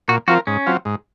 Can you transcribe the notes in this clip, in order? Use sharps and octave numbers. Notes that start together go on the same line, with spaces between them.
A#2 F#4
F3 C4 F4 F#4 A#4
G#2 C#4
F#3 C4 F4
G#2